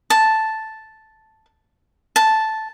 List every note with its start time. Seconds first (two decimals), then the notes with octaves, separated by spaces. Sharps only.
0.10 A5
2.16 A5